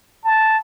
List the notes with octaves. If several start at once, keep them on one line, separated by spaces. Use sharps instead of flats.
A5